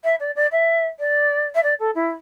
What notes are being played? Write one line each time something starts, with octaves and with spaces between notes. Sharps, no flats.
E5
D5
D5
E5
D5
E5
D5
A4
E4